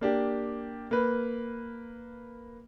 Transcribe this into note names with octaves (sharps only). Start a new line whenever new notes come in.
A#3 D4 G4
A#3 B4